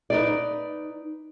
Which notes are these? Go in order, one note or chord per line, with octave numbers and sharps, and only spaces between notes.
D#4 B4 D5